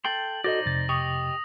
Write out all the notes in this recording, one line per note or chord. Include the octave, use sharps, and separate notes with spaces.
A4 G5 C6 F#7
D#4 F#4 A4 C5 D5 D#5 A#6
F2 C3 A6
G4 D#5 C#6 D#6